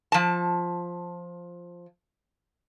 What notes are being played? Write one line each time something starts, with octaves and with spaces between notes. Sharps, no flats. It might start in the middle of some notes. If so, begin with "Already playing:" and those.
F3 A5